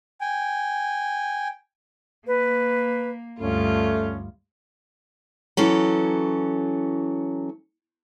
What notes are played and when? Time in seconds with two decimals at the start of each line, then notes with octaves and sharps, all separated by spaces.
0.21 G5 G#5
2.27 A#3 B4
3.40 D2 G2 A3 C#4 F4
5.57 E3 F#3 C#4 A4